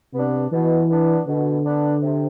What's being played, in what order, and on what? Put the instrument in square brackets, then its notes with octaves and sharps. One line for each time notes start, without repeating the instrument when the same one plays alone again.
[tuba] C3 [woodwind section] B3 D4
[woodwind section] B2 [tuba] E3
[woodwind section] B3 D4
[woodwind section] B2 [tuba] D3
[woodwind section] B3 D4
C3